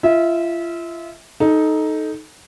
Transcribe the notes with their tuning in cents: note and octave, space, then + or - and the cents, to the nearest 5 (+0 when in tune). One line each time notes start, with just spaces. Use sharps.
F4 -35 E5 -25
D#4 +5 A4 -15